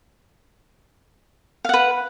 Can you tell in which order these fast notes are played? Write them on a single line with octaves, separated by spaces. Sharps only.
F5 F#5 B4